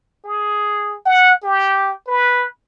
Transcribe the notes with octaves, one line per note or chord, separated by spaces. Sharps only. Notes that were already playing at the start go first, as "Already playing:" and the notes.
G#4
F#5
G4
B4